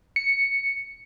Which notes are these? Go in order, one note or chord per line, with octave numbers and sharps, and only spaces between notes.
C#7